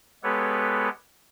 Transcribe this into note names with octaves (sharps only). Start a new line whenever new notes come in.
G#3 B3 G4 A4 B4 C#5